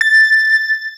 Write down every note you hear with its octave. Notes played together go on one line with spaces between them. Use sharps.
A6